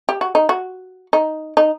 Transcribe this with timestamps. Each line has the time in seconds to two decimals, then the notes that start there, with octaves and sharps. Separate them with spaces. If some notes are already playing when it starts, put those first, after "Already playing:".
0.09 G4
0.21 F#4
0.35 D#4
0.49 F#4
1.13 D#4
1.57 D#4